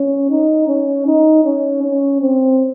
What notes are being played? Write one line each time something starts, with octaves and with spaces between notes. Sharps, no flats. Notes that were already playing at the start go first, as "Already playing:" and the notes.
Already playing: C#4
D#4
C#4
D#4
C#4
C#4
C4